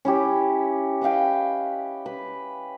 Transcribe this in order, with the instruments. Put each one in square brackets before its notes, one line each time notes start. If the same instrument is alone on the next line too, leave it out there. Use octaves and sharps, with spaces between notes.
[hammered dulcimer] C#4 E4 G4
B4 D#5 F5 G5
B4